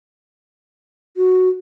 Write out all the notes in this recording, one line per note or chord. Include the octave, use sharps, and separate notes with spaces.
F#4